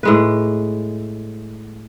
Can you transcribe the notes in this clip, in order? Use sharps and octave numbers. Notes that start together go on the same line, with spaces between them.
A2 G#3 B4